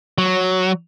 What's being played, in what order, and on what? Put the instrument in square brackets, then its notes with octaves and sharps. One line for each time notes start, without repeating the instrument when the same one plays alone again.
[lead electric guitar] F#3